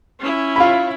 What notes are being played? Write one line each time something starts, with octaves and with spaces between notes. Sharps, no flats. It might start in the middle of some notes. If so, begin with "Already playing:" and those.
C#4 E4
F4 B5